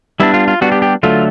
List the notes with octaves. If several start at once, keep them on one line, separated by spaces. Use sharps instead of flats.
G3 B3 D4 E4
F4
F4
G3 B3 D4 F#4
G4
G4
D3 F#3 A3 F4